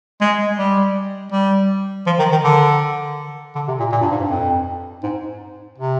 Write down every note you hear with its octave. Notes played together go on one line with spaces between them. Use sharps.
G#3
G3
G3
F3
D#3
D#3
D3
D3
C3
A#2
A#2
G2
G#2
G2
F2
G#2
C3